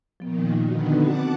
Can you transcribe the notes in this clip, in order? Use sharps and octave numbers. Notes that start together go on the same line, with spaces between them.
A#2 D#3 F3 B3
D3 D#3 B3 F#4
C4 F#4 F#5 A5 D6